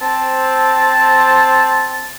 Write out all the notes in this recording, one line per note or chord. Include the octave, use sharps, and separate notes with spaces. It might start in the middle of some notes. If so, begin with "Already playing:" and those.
C4 A5